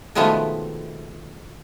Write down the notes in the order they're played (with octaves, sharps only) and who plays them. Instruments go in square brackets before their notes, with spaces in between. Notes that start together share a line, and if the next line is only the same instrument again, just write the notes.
[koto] B2 D#3 F3 G#3 A3 B3